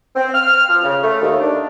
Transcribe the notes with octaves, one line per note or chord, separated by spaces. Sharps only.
C4
F6
F3
C#3
A3
D#2
D4